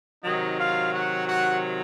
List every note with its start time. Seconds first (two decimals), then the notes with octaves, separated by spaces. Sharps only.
0.23 C3 D#3 F#3 D#4 D#5
0.58 F4 F5
0.93 F#4 F#5
1.28 F#4 F#5